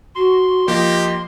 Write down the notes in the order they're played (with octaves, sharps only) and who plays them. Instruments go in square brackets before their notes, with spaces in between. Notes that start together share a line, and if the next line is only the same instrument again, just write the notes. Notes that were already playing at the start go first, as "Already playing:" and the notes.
[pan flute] F#4 [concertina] C6
[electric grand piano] F3 A#3 [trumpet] G4 [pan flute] D#5